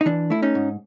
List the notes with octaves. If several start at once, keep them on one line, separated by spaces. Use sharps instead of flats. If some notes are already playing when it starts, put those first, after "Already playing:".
D#4
E3 D4
A3 E4
C#4 D#4
G#2